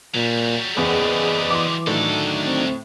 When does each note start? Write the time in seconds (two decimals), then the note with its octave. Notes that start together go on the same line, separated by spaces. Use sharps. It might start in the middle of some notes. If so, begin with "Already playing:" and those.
0.15 A#2 F#3 G3
0.77 F#1 E2 B3 G#4 D5 D#5
1.50 E3 C6 D6
1.87 D2 A2 D#3 F#3 D4 A4
2.45 C4